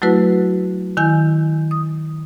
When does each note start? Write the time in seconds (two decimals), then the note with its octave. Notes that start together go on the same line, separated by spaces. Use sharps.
0.02 F#3 A3 E4 F#4 B4
0.97 D#3 E4 G#5 G6
1.71 D#6